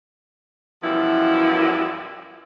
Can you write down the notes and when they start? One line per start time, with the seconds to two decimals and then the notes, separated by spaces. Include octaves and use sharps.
0.83 F#2 B2 E3 F3 G3 E4